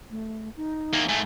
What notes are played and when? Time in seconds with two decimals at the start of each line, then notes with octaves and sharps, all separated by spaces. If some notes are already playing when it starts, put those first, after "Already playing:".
0.11 A3
0.57 D#4
0.93 E2 A#3
1.09 G#2 A3 G#5